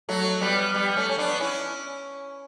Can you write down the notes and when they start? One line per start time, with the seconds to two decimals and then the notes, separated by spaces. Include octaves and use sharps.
0.09 F#3 A3
0.41 G3 B3
0.74 G3 B3
0.97 A3 C#4
1.09 C#4
1.18 B3 D4
1.40 C#4 E4